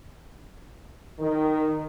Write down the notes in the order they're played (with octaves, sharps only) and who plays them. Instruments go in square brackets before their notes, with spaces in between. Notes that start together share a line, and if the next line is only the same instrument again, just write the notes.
[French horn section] D#3